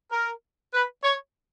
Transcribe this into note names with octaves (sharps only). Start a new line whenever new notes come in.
A#4
B4
C#5